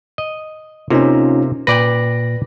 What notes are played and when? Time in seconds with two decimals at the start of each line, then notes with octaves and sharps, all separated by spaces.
0.18 D#5
0.90 C3 A#3 C#4 D#4 F4
1.67 A#2 B4 D5 G5 A#6